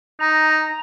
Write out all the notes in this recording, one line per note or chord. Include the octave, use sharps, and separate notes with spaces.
D#4 A#5